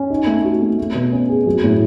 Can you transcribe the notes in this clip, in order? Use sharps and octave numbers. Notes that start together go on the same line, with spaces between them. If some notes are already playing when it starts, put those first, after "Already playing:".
Already playing: C#4
D#4
A3
F#4
A3
A3
B2
C#4
G#4
F#3
A2